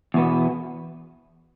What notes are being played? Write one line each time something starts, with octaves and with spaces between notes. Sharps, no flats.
E2 B2 B3